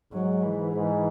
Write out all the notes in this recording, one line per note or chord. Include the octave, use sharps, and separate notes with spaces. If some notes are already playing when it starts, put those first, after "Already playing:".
G#2 F#3
E3
G#2